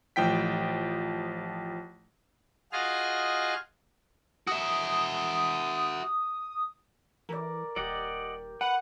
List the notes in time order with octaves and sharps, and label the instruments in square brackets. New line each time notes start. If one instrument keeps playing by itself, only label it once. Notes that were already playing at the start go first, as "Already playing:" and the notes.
[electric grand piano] A1 F3 G5 B6
[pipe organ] F4 F#4 G#4 D#5 F5 F6
[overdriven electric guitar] F#4 E5 [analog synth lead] D#6
[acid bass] E3 [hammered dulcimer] A#4 D5
[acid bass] D#1 [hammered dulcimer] G4 [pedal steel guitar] D5 D#5 F#5
[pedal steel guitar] B4 [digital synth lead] F#5